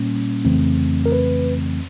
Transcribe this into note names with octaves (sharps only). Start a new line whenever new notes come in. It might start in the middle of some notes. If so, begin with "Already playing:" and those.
Already playing: A#2 G3 A#3 C#4
F2 C#3 E3 A3 C4
A#4
B4